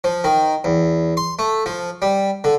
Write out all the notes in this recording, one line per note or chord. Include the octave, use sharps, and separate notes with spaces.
F3
D#3
E2
C6
A3
F3
G3
D3